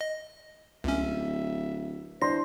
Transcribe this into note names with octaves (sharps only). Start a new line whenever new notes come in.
D#5
D1 C#2 C#4 E5
E3 D4 C5 C6 A#6